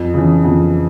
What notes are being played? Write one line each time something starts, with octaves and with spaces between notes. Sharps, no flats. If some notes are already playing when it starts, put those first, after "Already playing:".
Already playing: F2
C#3 E3
F2